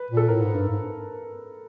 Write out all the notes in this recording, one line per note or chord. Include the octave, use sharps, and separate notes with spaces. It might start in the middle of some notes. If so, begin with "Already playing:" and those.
Already playing: B4
A#2
A4
A2 A#4
G#2
G2
G#2